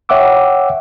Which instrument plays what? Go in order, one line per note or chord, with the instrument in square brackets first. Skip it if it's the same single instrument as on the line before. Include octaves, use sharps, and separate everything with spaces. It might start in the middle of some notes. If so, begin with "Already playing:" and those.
[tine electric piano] C#5 E5 F#5 G5 D6 E6